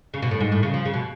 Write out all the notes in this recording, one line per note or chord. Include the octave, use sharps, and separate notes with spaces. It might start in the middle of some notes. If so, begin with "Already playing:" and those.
C#3
B2
A2
G#2
A2
C#3
F3
C#3
B2